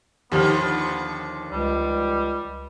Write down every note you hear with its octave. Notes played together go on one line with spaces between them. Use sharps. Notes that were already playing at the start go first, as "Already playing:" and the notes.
D#2 D3 D#3 F3 B3 G4 F6
C#2 G3